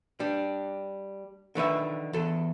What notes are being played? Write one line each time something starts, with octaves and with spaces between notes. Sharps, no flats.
G3 D4
D3 D#3 B4 E5
E2 A4